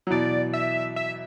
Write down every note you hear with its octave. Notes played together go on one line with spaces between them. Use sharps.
F#3
B2 E3 D5
E5
E5